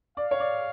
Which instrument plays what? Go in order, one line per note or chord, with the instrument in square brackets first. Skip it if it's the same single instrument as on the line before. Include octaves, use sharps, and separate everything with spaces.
[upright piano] D5 [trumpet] F5
[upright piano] C#5
D5